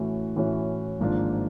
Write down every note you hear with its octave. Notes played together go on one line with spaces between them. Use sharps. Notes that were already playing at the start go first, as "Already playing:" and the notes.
Already playing: A2 E3 A3 C#4 F#4
A2 E3 A3 C#4 F#4
G#1 G#2 F3 A#3 D4